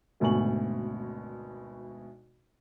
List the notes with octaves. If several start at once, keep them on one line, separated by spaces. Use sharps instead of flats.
G#1 D2 B2 G#5 C#6 F#7